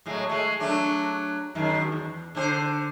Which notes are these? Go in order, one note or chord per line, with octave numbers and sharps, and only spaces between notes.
A2 F#3 G#3
G#3 A3
F#3 A3 D4
F#2 D#3 G#3
E2
D3 C#4 C5